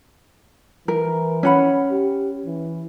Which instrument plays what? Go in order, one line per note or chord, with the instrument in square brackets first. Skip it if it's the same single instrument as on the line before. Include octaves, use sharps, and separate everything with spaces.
[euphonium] E3 [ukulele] A#4
[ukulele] C#4 F#5 B5
[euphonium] G4
E3